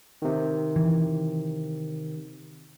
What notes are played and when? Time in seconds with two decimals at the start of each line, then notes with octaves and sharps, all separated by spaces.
0.22 C3 D#3
0.76 E3